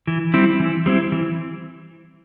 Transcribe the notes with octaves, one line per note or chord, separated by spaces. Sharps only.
E3
G3 C4 E4
E3
G3 C4 E4
E3